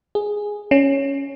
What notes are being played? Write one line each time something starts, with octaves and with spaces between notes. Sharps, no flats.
G#4
C#4